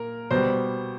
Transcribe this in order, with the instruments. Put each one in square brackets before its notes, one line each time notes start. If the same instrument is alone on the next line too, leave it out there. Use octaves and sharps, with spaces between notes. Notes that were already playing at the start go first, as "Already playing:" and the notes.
Already playing: [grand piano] A#2 A#4
B2 G3 C5